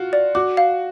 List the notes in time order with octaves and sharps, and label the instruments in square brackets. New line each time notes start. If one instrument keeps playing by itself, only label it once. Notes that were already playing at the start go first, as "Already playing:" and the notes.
Already playing: [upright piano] F4 F#4
[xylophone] D5
[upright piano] F#4 [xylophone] D6
[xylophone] F5